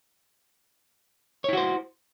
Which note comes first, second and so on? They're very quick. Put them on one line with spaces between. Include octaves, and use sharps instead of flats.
C#5 E4 F#4 C5